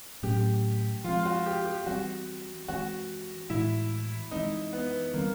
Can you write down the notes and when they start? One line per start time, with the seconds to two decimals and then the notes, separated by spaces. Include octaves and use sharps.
0.23 A2 F#3 A3 C#4 G4
1.04 F3 G#3 C4 F4
1.20 F4
1.25 F#4
1.46 G4
1.65 G4
1.87 E3 G3 C4 F#4
2.68 E3 G#3 C4 F#4
3.49 A2 E3 G#3 E4
4.31 E3 G#3 C4 D#4
4.73 B3
5.14 D#3 G3 A#3 C4